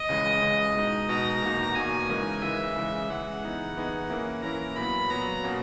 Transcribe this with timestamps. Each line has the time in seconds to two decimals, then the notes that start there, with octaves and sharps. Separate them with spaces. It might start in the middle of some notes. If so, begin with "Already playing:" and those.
Already playing: D#5
0.09 C#2 C#3 E3 G#3
0.41 C#2 C#3 E3 G#3
0.75 B2 G#3 D#4
1.08 B2 G#3 D#4 A#5
1.42 E2 B2 A#3 D#4 F#4
1.75 E2 B2 A#3 D#4 F#4 G#5
2.09 C#3 E3 G#3 D#4 A#4
2.42 C#3 E3 G#3 D#4 A#4 E5
2.76 C#3 E3 G#3
3.09 C#3 E3 G#3 F#5
3.43 E3 B3 D#4 G#4
3.77 E3 B3 D#4 G#4
4.10 E3 A#3 C#4 E4 A#4
4.43 E3 A#3 C#4 E4 A#4 A#5
4.76 A#2 F#3 B3 B5
5.10 A#2 F#3 B3 A#5
5.44 B2 A#3 C#4